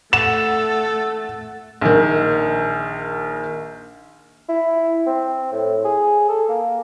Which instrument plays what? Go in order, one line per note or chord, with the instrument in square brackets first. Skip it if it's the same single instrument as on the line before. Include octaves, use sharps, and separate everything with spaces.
[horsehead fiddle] A3 [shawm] A4 [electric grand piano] F#5 [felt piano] E7
[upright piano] A#1 D#3
[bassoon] E4
C4
A2
G#4
A4
A#3